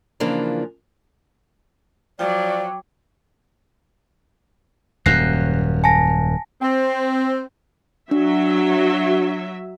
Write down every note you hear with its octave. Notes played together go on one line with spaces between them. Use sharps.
C#3 E3 F3 A#3 D4
F3 F#3 D5 G5 D6
D#1 F#2 F#6 A#6 C7
G#5 A5 A#6
C4
F#3 D4 E5